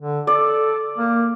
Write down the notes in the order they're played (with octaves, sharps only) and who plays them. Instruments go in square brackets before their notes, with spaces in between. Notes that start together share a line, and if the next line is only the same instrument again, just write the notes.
[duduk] D3
[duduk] A4 [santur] D5
[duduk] A#3